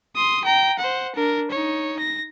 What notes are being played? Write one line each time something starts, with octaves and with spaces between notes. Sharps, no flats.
C6 D#6
G5 A#5
C5 F#5
D4 A#4
D#4 C#5
A#6